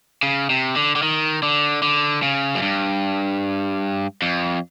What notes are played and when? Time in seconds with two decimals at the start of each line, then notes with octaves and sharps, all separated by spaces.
0.23 C#3
0.50 C3
0.76 D3
0.96 D3
1.03 D#3
1.43 D3
1.82 D3
2.23 C#3
2.55 F#2
2.62 G2
4.22 F2